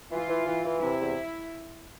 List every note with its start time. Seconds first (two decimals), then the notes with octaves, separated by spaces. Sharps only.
0.11 E3 F4
0.29 E3
0.47 E3
0.65 E3
0.82 C3 E4
1.00 E2